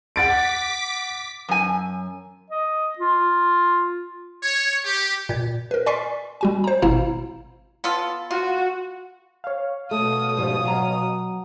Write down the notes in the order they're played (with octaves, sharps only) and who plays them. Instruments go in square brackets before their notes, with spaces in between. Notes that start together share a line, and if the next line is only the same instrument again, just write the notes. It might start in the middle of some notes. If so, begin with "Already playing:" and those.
[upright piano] F#5 A6 D7 [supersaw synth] D6 B6
[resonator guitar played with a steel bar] F#2 G#5
[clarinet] D#5
F4
[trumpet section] C#5
G4
[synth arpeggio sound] A#2 G#6
A#4 B4
D5 G#5 C6 C#6 B6 C7
G3 F#4 G#5
C5 A#5
G#1 B2 E4 F5 A#5 E7
[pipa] B3 F4 A4
[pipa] F4 [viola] F#4
[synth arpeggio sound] C#5 F5
[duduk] B2 [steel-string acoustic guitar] A3 [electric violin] D#6
[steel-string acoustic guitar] G#2 F3 G3
F#3 A#5